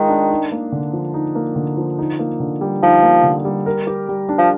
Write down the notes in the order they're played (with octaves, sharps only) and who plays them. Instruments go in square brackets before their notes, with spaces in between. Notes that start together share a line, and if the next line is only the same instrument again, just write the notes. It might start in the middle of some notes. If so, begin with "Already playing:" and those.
Already playing: [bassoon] D#3 [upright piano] G#3 F4
[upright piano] D4
D#4
A#3
D3
F3
D#4
A#3
D3
F3
D#4
A#3
D3
G3
[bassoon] F3 [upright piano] D#4
[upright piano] A#3
D3
G3
A#4
G4
G3
D4
[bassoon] F3